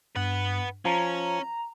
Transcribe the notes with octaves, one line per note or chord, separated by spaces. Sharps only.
G2 B4 F#5
F3 C#4 A#5